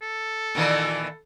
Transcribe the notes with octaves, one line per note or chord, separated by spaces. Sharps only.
A4
A#2 D#3 E3